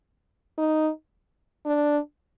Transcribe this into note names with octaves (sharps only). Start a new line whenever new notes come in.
D#4
D4